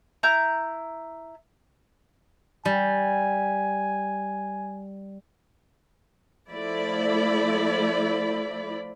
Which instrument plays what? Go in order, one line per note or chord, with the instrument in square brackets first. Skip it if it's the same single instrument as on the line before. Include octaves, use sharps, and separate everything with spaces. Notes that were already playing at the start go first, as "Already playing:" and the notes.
[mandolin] E4 A#5 G6
[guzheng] G3 [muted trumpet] G#5
[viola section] F3 A3 E4 D5 B5